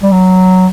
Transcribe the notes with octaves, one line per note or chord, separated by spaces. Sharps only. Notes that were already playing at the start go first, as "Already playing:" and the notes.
G3
F#3